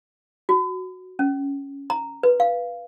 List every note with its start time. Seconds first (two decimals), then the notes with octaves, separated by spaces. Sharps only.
0.49 F#4
1.19 C#4
1.90 A#5
2.23 B4
2.40 F5